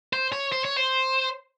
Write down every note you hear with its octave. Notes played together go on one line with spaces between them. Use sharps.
C5
C#5
C5
C#5
C5